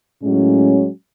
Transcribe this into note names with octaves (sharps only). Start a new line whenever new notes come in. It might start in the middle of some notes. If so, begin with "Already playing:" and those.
A2 F#3 G#3 C#4